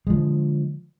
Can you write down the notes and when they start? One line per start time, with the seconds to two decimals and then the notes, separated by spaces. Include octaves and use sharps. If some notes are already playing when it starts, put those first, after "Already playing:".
0.07 G#3
0.10 F3
0.13 D3